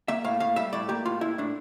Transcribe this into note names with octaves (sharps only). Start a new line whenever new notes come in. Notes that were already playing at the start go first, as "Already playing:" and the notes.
A#3 E5
A2 F5
A2 F5
G3 E5
A2 D5
A#3 G4
A2 F4
A2 E4
A2 D4